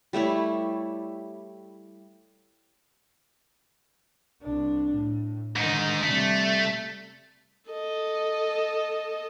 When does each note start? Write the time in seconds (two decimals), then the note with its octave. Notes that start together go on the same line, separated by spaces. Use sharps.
0.13 G3 A3 E4 C#5
4.42 C2 D4
4.91 A2
5.56 G#2 D3 D#3 D#4
6.03 C3 G3 A3
7.70 A4 D#5